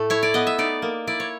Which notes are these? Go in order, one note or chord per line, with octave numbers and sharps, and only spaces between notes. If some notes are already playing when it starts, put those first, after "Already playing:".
Already playing: A2 A3
E4 C#5
D5
B3 D#5
E5
D#4 D5
A#3
E4 D5
C#5